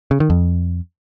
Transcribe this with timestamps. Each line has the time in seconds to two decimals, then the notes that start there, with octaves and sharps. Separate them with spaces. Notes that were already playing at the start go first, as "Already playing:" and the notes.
0.11 C#3
0.20 D#3
0.30 F2